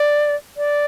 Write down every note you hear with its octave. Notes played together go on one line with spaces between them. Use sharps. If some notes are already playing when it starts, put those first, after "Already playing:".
Already playing: D5
D5